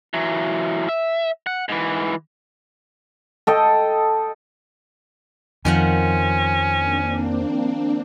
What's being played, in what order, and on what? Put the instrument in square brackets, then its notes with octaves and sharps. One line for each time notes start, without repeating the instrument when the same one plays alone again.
[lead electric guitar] E3 F#3
E5
F#5
G#2 E3
[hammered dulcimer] A4 D#5 G5
[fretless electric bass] F2 [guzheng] D#3 F3 F#5 [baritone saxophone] C#4
[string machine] A#3 C4 D4